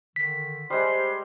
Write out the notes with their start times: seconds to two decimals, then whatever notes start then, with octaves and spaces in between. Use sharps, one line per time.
0.16 D3 D#3 B6
0.70 G3 G#3 C5 C6